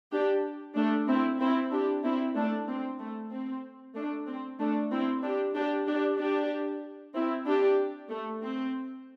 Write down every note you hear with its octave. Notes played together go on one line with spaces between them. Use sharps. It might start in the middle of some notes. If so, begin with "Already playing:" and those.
D4 G4
A3 D4
C4 E4
C4 E4
D4 G4
C4 E4
A3 D4
C4
A3
C4
A3 D4
C4
A3 D4
C4 E4
D4 G4
D4 G4
D4 G4
D4 G4
C4 E4
D4 G4
A3
C4